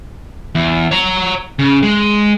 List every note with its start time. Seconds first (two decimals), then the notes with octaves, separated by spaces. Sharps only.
0.55 E2
0.91 C#5 A#5
1.59 C#3
1.83 G#3